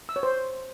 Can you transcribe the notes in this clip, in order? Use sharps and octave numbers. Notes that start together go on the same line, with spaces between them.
E6
C#5
C5